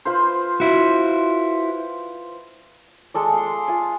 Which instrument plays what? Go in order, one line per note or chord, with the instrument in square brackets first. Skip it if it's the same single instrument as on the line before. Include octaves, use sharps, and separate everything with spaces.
[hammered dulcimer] F4 B4 C5
[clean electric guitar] E4 F#4
[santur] G#3 A4 D5
F5 C6
F4 G#5